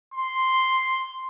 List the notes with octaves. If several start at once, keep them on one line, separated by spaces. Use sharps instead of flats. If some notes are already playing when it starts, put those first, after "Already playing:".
C6